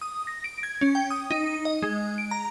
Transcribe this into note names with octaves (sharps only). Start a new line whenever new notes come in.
D#6
A#6
D7
G#6
C#4
G5
D#6
D#4
D#5
G#3
D7
A#5